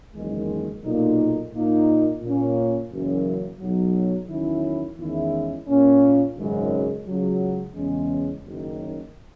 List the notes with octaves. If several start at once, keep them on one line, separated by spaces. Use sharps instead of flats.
F#1 E2 D#3 G#3
B1 A#2 A#3 D#4
A#2 A#3 D#4
A#2 A#3 C#4
F#1 F#2 E3 A#3
B1 B2 F#3
E2 D#3 F#3 C#4 E4
E2 D#3 G#3 C#4 E4
A#2 A#3 C#4
G#1 F#2 C#3 G#3
C#2 C#3 F#3
E2 C#3 G#3 C#4
F#1 F#2 D#3